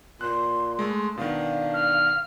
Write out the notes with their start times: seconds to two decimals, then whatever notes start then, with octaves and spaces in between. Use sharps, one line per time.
0.21 A#2 C6 F#6
0.79 G#3 A3
1.17 B2 D#3 D4 F5
1.74 F6